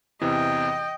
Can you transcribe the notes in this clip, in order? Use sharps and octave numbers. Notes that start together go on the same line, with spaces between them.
E2 C3 E3 D#5 G5